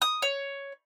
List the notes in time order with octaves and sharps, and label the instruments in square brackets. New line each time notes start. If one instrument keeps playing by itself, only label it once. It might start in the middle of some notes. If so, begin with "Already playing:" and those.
[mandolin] D#6
C#5